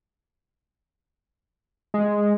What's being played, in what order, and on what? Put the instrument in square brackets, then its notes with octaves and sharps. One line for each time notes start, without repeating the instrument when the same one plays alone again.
[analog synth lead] G#3